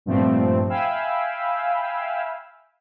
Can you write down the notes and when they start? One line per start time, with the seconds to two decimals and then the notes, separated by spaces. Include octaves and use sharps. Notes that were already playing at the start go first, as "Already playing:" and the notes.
0.06 G2 A#2 F3 A3 C4
0.70 E5 F5 G5 G#5 B5 E6